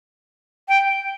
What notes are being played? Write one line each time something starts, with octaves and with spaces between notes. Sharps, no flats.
G5